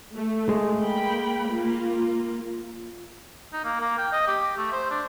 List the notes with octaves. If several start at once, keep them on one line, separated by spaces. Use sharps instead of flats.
A3
G#3
A#3 G5 B5
A#3 F4
D#4
A#3
A#3
G5
D#5
G4
A3
C5
D4